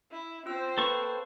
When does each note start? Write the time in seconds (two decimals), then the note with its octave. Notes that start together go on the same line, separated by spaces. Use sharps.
0.11 E4
0.46 C4 F4 C5 E6
0.78 A#3 A4 B4 C#6